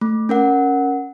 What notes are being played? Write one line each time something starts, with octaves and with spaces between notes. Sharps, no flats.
A3
C#4 A#4 F#5